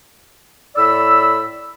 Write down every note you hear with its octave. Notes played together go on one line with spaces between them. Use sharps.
A2 D5 B5 E6